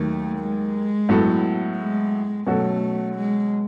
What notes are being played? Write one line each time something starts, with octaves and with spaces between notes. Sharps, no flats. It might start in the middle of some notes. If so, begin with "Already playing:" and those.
Already playing: D#2 D#3 F#3 A3
G#3
A2 F#3 B3 F#4 A4
G#3
B2 F#3 A3 C#4 F#4 A4
G#3